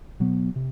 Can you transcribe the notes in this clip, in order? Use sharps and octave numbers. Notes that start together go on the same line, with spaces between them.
B2 F#3 B3
C3